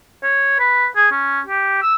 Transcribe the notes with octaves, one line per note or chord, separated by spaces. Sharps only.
C#5
B4
G#4
C#4
G4
E6